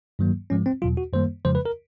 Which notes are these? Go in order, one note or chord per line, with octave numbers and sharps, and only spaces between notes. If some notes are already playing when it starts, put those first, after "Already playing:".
G2 D#3 F#3 A#3
G#2 F3 G#3 C#4
C4
E2 B2 F#3 F4
F#4
F#2 D#3 G3 A#3 C5
F2 C#3 F3 G#3 C5
B4
A#4